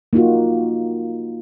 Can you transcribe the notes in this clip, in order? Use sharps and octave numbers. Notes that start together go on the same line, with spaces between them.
A#3 D#4 F4 F#4